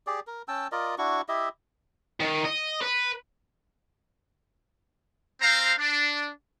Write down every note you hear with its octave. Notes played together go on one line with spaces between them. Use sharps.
G4 G#4 D5
A#4
C#4 G5 A5 E6
F4 A#4 D5 D#5
D4 E4 F#4 C#6
E4 G4 D#5 E5
D#3
D#5
B4
C4 C5 F5 A#5
D4